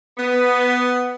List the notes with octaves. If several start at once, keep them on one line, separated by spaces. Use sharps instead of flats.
B3